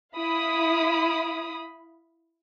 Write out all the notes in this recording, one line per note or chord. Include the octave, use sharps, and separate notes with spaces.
E4 F5 B5 D#6